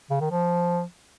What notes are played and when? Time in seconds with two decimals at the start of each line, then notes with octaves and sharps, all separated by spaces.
0.11 C#3
0.21 D#3
0.31 F3